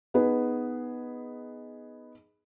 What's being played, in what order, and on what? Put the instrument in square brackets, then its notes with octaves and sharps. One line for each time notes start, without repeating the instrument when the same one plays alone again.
[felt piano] B3 D#4 G#4 B4